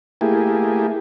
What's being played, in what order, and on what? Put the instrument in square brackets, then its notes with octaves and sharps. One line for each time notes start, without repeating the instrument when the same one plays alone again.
[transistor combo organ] A3 A#3 E4 G4 G#4